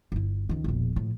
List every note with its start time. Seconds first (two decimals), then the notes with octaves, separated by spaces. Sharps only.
0.12 G1 E4
0.49 C#2 D#3
0.64 E1 A#1
0.96 A#1 A2